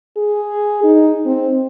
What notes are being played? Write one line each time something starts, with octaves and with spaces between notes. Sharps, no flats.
G#4
D#4
C4